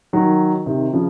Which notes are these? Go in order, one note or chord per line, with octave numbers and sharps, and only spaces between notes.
D#3 F#3
C3 D#3
C#3 F3